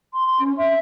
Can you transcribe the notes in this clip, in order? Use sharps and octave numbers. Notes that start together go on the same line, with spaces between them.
C6
C6
C#4
E5